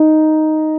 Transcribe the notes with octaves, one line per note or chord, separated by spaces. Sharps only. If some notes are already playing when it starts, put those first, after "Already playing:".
Already playing: D#4